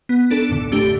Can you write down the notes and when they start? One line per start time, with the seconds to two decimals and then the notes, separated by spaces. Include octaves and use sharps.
0.09 B3
0.31 D4 A4
0.51 F#2 A2 D3
0.72 A3 D4 G4